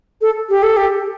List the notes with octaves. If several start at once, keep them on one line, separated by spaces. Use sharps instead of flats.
A4
G4
A4
G4